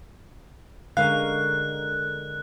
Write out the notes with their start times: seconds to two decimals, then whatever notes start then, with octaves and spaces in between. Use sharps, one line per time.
0.97 D3 G#3 C#4 A#4 F5 F#6